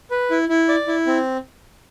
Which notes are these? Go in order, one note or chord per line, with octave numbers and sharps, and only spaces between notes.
B4
E4
E4
D5
E4
C4